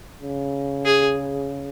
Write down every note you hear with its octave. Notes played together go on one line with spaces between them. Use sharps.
C#3
G#4